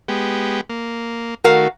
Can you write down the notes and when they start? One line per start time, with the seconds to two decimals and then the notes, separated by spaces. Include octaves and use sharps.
0.08 G#3 B3 G4
0.70 A#3
1.44 D#3 A3 F#4 A#4 F5